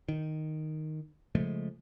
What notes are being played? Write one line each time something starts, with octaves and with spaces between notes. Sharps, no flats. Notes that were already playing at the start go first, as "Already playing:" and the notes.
D#3
C#3 F3 G#3 A3